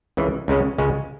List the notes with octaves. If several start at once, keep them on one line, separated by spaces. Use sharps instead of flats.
C#2 C#3 E3
C#2 C#3 G#3 C#4
C#2 C#3 G#3 C#4